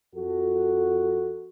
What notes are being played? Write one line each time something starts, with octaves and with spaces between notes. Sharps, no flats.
F2 F#4 A4